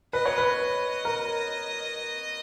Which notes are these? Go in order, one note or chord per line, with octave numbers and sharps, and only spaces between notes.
B4 D#5
C#5
B4
A#4